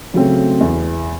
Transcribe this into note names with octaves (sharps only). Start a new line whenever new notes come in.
C#3 F#3 A3 C4
E2